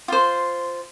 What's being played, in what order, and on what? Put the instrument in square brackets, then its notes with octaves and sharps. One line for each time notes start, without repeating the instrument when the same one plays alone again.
[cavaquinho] F4 C5